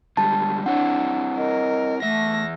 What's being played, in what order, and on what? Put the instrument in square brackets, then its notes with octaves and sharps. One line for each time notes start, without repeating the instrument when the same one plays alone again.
[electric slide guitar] D3 G3 G#3 [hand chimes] A5
[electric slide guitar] C4 E4 C#5 [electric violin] D4 [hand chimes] F#5
[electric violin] A#4 [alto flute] D#5
[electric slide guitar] E2 E5 [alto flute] A3 [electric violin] A#6